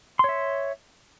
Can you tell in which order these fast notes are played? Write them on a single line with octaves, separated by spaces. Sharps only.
C6 C#5 E5